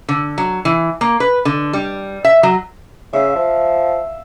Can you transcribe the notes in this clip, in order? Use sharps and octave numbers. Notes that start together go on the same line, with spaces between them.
D3
F#3
E3
A#3
B4
D3
G3
E5
F#3
C#3 E5 F5
F3